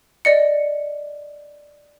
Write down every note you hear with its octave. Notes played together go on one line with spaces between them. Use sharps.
D5 D#5 C#7